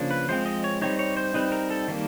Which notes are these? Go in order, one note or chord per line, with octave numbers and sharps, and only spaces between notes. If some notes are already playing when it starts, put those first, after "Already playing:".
Already playing: C#3 F3 A#3 D4
B4
F3 G#3 C4 C5
D#5
C#5
G3 C4 D#4 C#5
C#5
C5
G3 C4 D#4 B4
A#4
A4
D#3 G3 A#3